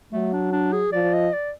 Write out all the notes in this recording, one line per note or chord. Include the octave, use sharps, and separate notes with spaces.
F#3 A3
D4
D4
G#4
F3 D5
D#5
D5